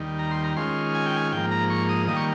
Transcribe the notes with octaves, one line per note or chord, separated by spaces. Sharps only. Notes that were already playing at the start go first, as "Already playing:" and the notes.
Already playing: D#2 D#3 G3
A#5
C6
A#5
D#3 G#3 C#4 F4 C6
G#5
G5
G#5
G#2 F3 A#3 G5
A#5
C#6
D#6
D#3 G3 A#3 D#6
C#6